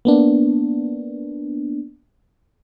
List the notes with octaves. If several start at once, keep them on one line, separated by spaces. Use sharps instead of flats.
A#3 B3 D4